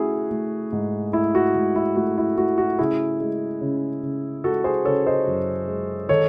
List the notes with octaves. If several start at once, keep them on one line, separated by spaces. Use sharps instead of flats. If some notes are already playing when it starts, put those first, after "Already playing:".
Already playing: A3 C#4 E4 F#4 G#4
A3
G#2
A3 E4
F#4
G#2
E4
A3 F#4
E4
A3 F#4
F#4
C#3 E4 G#4
G#3
C#3
C#3
G#3 F#4 A4
G#4 C5
C#3 A4 C#5
C5 D#5
F#2
G#3
D#3 A4 C#5